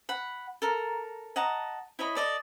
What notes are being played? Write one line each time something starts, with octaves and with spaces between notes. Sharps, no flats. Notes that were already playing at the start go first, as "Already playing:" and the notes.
F#5 B5
A4 A#4 A#5
D#5 F#5 A5 A#5
E4 C#5 D#5 B5
A4 D5 D#5